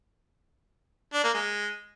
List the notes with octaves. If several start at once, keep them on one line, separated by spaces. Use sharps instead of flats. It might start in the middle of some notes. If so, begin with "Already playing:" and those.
D4
A#3
G#3